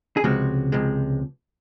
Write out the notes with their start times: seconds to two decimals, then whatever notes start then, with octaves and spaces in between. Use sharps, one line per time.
0.17 G#4
0.24 C#2 C3 F3 G#3 F#4
0.72 C#2 C3 F3 G#3